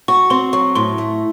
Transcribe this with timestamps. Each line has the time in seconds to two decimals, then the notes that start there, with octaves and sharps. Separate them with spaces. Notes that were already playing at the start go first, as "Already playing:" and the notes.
0.08 F#4 C#6
0.30 C4 C6
0.53 F#3 C#6
0.75 A2 C6
0.98 A3